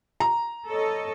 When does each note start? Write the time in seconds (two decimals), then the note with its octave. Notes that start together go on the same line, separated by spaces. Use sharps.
0.20 A#5
0.68 A4 C#5 D#5